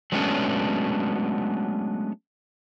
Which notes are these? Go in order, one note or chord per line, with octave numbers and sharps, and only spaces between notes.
F#3 G#3 A3 B3 C#4 D4